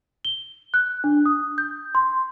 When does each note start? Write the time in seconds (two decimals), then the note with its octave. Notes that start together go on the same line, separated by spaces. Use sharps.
0.25 G7
0.74 F#6
1.04 D4
1.26 D#6
1.58 G6
1.95 C6